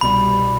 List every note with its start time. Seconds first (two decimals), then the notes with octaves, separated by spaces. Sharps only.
0.01 C2 B2 G3 B5